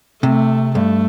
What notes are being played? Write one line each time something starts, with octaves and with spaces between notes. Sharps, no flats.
C3 A3
G2 A3